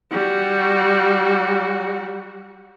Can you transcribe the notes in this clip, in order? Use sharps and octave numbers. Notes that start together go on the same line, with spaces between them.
G3 F#4